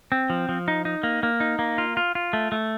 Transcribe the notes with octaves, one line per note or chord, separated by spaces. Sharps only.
C4
F3
F3
D#4
D#4
A#3
A#3
D#4
A#3
F4
F4
F4
A3
A3